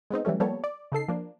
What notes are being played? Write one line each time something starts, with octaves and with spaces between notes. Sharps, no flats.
G#3 B3 C4 D#4
E3 F#3 G3 A3 C#4
F3 G3 A#3 B3 A4 C#5
D5
C#3 D#4 A4 C7
F3 A#3 D4